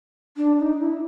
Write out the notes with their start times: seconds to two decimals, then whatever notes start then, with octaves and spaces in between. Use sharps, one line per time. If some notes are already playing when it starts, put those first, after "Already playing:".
0.37 D4
0.58 D#4
0.80 E4